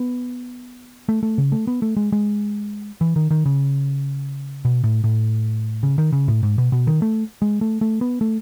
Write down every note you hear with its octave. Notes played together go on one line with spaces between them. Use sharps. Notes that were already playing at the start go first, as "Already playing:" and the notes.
Already playing: B3
A3
A3
C#3
A3
B3
A3
G#3
G#3
E3
D#3
D#3
C#3
B2
A2
A2
C#3
D#3
C#3
A2
G#2
B2
B2
D#3
A3
G#3
A3
A3
B3
A3